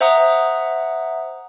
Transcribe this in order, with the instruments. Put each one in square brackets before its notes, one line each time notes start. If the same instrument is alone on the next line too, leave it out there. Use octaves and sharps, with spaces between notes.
[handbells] C5 E5 F#5 A#5 D#6